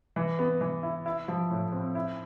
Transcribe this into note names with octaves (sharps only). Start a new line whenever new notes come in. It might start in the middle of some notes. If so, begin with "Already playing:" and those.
E3
B3
E3
E4
E4
F3
A2
C4
E4